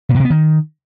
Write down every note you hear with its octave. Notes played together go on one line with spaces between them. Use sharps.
C3
A#2
C3
B3
D#3